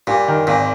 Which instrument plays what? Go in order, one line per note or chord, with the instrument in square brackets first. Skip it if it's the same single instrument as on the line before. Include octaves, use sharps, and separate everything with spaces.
[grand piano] G2 [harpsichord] A#2
[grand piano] D#3
[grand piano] G#1 [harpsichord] A#2